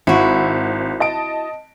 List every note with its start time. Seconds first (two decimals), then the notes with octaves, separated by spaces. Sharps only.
0.07 G#1 E4 F#4
1.00 D#5 A5 D7